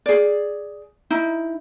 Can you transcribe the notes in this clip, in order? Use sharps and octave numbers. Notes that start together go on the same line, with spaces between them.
G#4 D5
D#4 E4